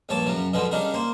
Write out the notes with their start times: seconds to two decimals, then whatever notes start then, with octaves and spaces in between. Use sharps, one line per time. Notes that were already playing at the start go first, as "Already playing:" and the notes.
0.09 A#1 G2 C#5 A5 D6
0.26 F#2 C#3 F#3
0.53 B2 D3 F3 G#3 B3
0.71 C#3 G3 D4 D#4 A#4
0.94 A#3 C5